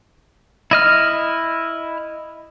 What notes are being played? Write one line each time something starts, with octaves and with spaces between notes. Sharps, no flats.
E4 D#5 F6